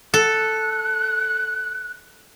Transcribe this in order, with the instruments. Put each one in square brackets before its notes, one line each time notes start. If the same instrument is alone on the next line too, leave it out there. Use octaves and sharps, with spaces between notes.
[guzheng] A4 [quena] F#6